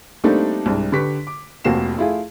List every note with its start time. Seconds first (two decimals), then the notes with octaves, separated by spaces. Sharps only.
0.24 G3 A3 A#3 C4 D4 D#4
0.66 C2 G#2 D4
0.92 D3 G4 B4 C#6 B6
1.27 D6
1.64 F1 F2 A#3 F#4 C7 E7
1.97 A3 E4 F4 G#4